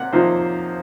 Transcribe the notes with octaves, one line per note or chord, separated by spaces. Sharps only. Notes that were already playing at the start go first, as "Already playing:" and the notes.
Already playing: C3 A#3 F#5
C3 F3 A#3 D#4 C5